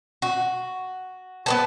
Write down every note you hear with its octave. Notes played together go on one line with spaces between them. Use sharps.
F#4
B3 B4 A5